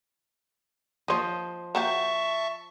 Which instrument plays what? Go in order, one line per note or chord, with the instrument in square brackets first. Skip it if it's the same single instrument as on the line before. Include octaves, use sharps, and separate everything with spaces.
[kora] F3 C5 D#5 [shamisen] A#3 C#5
[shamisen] A#3 F#4 G4 [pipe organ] E5 A5 C#6